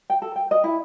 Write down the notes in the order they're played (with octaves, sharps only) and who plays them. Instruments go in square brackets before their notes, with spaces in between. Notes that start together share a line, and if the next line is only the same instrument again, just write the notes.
[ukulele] G5
A4
G5
D#5
E4